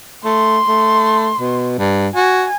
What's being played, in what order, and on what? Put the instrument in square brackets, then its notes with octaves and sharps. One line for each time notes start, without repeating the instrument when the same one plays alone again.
[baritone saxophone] A3 [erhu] C6
[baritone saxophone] A3
B2
G2
[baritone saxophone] F#4 [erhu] G#5